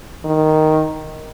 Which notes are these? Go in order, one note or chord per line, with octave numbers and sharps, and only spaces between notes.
D#3